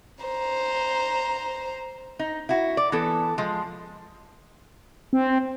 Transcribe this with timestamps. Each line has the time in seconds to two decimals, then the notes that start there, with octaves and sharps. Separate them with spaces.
0.24 C5 A#5
2.19 D#4
2.49 E4 F#4
2.77 D5
2.92 E3 B3 A4
3.38 F3 G#3
5.13 C4